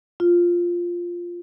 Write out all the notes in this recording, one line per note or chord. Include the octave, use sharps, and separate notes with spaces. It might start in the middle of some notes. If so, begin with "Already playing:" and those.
F4